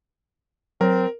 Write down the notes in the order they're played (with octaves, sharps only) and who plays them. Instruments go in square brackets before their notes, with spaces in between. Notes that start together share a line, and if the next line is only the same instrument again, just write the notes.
[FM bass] F#3 [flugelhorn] C4 [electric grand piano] A#4